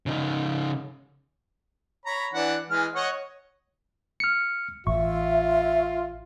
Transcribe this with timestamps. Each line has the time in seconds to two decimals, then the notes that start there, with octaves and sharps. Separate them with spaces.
0.06 C#3 D#4
2.06 C#5 A#5 B5
2.34 E3 D4 F#5
2.70 E3 G#3 F6
2.95 C#5 D#5 F#5
4.20 F6 C#7
4.87 A1 F4 E5 C#6